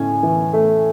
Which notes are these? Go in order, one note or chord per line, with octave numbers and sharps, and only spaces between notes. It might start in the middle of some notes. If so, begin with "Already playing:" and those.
Already playing: A2 C#4 G#5
E3
A3